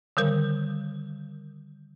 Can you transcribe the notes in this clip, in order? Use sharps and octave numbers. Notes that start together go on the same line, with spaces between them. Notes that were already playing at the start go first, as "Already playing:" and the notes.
D3 D#3 G3 A#4